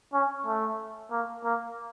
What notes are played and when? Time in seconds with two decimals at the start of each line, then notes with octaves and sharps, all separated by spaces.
0.14 C#4
0.46 A3
1.12 A#3
1.45 A#3